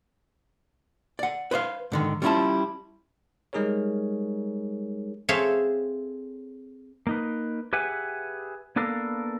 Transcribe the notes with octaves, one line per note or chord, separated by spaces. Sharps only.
D5 F#5
B4 C5 D#5 F5
G#2 D3 D#3
G3 G#3 C#4 E4 F4 A5
G3 G#3 D#4 G#4 A#4 C#5
C4 G#4 A4 C#5 E5 F5
A#3 D#4 B4
G4 G#4 B4 E5 F#5 G#5
A#3 B3 D4 A4 A#4 F5